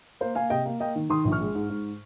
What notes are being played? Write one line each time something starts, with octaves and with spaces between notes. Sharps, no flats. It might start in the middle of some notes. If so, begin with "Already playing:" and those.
A#3 C5
A#3 F5 G#5
C3 D#5 G5
A#3
A#3 D#5 G5
D#3
D#3 C6 D#6
A#1
C#6 F6
G#3
G#2
G#2